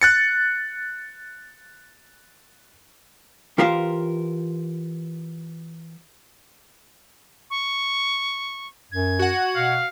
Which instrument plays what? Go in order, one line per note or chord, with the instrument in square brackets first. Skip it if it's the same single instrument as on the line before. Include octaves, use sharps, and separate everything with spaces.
[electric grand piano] F#6 A6 C#7
[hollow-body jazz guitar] E3 F4 G4 A#4 C5 F5
[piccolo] C#6
[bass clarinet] F#2 [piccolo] G#6
[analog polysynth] F#4 F#5
[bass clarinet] B2 [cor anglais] F5